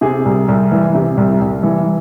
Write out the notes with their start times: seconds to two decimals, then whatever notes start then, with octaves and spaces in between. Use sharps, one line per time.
0.01 C3 G#4
0.25 C2
0.48 C2
0.71 E3
0.95 C3
1.17 C2
1.41 C2
1.63 E3